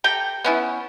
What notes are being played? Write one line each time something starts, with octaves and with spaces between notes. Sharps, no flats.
G4 A4 G5 A#5
B3 C#4 E4